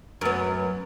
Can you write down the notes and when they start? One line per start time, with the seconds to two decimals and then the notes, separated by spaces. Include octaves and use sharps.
0.21 F#2 B3